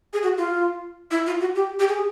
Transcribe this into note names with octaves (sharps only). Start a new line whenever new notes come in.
G#4
F#4
F4
E4
F4
F#4
G4
G4
G#4